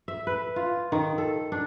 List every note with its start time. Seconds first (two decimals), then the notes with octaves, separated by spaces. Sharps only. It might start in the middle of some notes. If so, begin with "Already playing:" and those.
0.08 E5
0.27 B4
0.56 F4
0.92 D#3
1.18 A4
1.52 D4